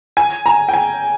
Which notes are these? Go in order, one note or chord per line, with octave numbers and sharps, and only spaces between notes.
G#5
A#5
G5
G#5